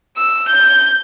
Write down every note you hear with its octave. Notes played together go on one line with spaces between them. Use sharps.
E6
G6